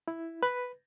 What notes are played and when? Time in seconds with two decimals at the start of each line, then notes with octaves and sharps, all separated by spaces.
0.08 E4
0.43 B4